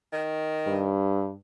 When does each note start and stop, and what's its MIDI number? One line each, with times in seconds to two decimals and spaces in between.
0.13 0.95 51
0.67 1.34 43